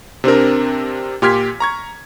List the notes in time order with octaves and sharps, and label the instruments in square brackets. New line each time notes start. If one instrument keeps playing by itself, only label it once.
[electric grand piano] C3 C4 D4 A#4
A#2 G4 C6 F6 G#6 B6
A#5 C#6 G#6